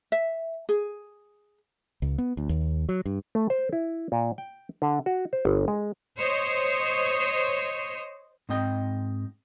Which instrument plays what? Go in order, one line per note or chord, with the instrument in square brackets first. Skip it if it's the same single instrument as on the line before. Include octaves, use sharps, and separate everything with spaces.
[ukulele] E5
G#4
[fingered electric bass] C#2
B3
D2
D#2
F#3
G2
[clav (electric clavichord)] A3
C5
E4
A#2
G5
D3
F#4
C5
G1
G#3
[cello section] C5 C#5 D#5
[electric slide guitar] G#2 C4 D#5 G5